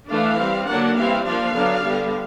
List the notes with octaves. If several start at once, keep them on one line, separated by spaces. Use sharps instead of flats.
E3 A3 D4 F5
G3 C4
D3 F#3 A#3 D4 F#5
E3 G3 C4 F5
F3 A#3 D4 F5
D3 F#3 B3 D4
D3 G3 B3